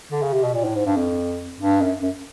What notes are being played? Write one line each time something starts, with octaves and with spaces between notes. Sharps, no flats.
D3
C#3
C3
B2
A#2
A2
G#2
G2
F2
G2
F#2
F#2